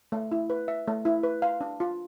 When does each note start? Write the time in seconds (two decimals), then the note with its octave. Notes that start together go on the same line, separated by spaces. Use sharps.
0.12 A3
0.32 E4
0.50 B4
0.68 E5
0.88 A3
1.05 E4
1.23 B4
1.42 F5
1.61 D4
1.80 F4